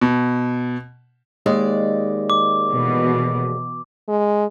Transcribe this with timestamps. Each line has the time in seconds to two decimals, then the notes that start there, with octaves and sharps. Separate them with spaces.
0.01 B2
1.46 D#2 G#3 D5
2.30 D6
2.71 B2 E3
4.08 G#3